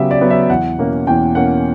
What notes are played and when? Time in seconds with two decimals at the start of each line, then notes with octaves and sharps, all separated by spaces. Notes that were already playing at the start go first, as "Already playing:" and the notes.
Already playing: C#3 F#3 B3 G4 E5
0.11 D5
0.21 F#3 B3
0.30 E5
0.49 E2 F#5
0.78 B2 A#3 C#4
1.07 E2 G5
1.35 B2 A#3 C#4 F#5